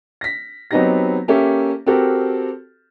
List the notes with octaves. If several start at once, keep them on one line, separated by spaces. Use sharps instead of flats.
A#6 B6
F#3 B3 C4 D#4 G4 A#6
A#3 C#4 G4 A4 E5
C4 F#4 G4 A4 A#4